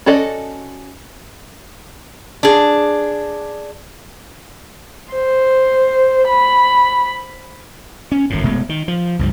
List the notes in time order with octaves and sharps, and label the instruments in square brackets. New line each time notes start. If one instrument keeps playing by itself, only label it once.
[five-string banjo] C#4 F#4 A4 D5 D#5
[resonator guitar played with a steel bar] D4 G#4
[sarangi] C5
B5
[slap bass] C#4
G#1 F#2 A2
F1 B2 G#3 A3
D#3
F3
C#2 G2 F3